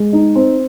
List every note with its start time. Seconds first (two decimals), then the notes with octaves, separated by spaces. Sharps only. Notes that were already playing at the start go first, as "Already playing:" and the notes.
Already playing: G#3
0.13 D#4
0.35 C4